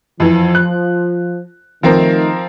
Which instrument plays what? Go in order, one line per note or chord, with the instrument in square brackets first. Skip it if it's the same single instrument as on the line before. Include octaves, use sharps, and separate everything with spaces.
[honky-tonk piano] F2 E3 [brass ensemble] F3
[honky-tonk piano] F#6
[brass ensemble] D#3 A3 [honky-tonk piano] F3 C4 A#4